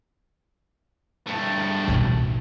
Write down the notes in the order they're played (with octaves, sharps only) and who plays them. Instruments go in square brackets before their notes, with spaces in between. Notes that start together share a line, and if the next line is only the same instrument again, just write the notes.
[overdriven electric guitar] G2 A3
[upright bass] B2 D#4